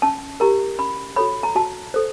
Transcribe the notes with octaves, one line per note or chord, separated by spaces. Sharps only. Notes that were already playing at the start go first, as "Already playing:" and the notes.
C#4 A5
E4 G4 A#4 A#5
C#4 B5
F#4 A4 C#5 B5
A#5
F#4 A5
A4 C5